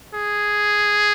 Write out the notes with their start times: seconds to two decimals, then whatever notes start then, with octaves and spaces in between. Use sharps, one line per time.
0.14 G#4